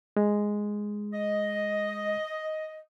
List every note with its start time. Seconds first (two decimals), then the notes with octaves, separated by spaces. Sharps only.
0.17 G#3
1.13 D#5